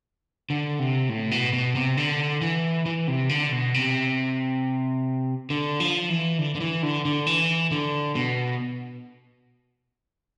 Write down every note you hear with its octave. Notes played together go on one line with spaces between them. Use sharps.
D3
C3
A2
B2
B2
C3
D3
E3
E3
C3
D3
B2
C3
D3
F3
E3
D3
D3
E3
D3
D3
E3
D3
B2